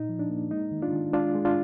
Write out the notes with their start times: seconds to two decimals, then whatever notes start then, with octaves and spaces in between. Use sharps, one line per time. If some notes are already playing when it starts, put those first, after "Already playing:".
Already playing: A#2 D#4
0.09 F3
0.19 D4
0.30 A#3
0.51 G#3 D#4
0.72 D#3
0.82 D4 F4
0.93 D#3
1.13 G#3 D4 F4
1.35 G#3
1.45 D4 F4